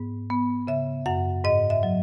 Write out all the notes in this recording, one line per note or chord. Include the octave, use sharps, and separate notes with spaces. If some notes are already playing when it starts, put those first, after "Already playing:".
Already playing: G#2 B3
B3
C#3 E5
F#2 F#5
G#2 D#5
E5
F#3